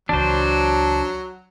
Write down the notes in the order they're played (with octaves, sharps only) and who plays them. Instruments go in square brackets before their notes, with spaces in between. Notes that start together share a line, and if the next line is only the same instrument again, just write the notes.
[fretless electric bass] C#2 E3 [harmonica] F#3 [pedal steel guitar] D4 C5